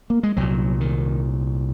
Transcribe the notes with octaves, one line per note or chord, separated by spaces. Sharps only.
A#3
G#3
C2 A#2 F#3
D#3